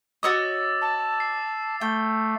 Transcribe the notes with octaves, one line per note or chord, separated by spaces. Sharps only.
F#4 C#5 D#5 D6 E6 A6
A5
C7
A3 G5